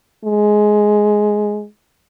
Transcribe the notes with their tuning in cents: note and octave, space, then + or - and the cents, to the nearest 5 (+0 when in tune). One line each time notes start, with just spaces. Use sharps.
G#3 +10